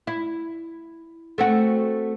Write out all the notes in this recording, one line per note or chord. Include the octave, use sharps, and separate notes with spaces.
E4
A3 C4 F#4